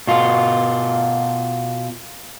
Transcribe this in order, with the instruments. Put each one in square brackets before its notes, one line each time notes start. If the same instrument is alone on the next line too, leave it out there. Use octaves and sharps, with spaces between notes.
[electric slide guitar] B2 F4